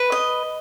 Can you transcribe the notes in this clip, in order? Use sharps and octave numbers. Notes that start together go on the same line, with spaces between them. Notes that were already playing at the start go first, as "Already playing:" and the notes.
Already playing: B4
D#5